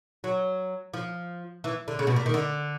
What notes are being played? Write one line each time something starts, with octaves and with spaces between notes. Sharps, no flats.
F#3
F3
E3
D3
C#3
B2
A#2
D#3
D3